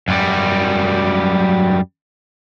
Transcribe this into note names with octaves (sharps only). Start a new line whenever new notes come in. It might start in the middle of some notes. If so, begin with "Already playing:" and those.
F#2 G3